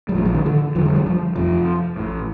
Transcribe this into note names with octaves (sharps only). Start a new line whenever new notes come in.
G3
A#1 A2 F3
F3
D#3
D3
F1 D#2 D3 F3
G3
G3
F3
F1 F2 C3 F3
A1 A2